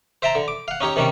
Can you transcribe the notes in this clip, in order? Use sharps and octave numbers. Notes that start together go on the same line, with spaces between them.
C5 E5 G5 A5 A#5
D3
D6
F5 F#5
C#4 D#4 G4 C#5
C3 D#3 G3 C#4 D4